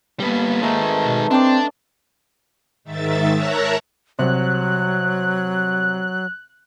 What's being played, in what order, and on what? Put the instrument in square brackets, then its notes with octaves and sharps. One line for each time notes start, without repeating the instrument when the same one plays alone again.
[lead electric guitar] G3 B3 [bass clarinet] A#3
[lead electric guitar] D#3 G#3 [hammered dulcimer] A3 D#4 B4
[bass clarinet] B2
[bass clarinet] C4 [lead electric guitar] D4 [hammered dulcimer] D5 A5 C6
[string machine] G#2 D#3 E5 A6
A#4 C#5 E5 A5 A#5 F#6
[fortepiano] C2 [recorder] F#3 [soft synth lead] F#6